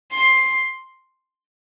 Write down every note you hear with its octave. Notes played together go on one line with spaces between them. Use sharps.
C6